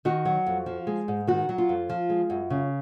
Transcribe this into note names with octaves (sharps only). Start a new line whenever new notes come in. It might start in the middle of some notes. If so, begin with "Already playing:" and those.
D#3 F#4
F#3
F2
F3
G#3
G#2
D#3 F#4
F#3
F4
F2
F3
G#3
F#2
C#3